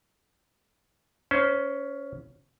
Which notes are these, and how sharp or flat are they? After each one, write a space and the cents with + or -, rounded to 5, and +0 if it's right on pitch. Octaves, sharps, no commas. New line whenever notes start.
C#4 +15 C5 -10